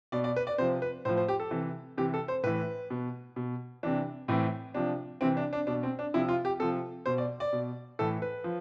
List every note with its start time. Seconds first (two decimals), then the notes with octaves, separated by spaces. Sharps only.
0.12 B2 D5
0.24 D5
0.36 B4
0.47 D5
0.58 C3 F3 C5
0.82 B4
1.05 A2 F3 C5
1.17 C5
1.28 G4
1.40 A4
1.51 C3 E3
1.98 C3 E3 G4
2.14 A4
2.28 C5
2.43 A2 E3 B4
2.90 B2
3.36 B2
3.83 C3 E3 D4
4.28 A2 E3 C4
4.74 C3 F3 D4
5.21 C3 E3 C4
5.37 D4
5.53 D4
5.67 B2 D4
5.83 C4
5.99 D4
6.14 C3 F3 E4
6.29 F4
6.45 G4
6.59 C3 F3 A4
7.06 B2 C5
7.18 D5
7.40 D5
7.53 B2
7.99 A2 E3 A4
8.22 B4
8.44 F3